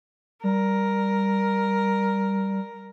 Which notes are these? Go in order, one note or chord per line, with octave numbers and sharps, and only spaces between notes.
G3 A#4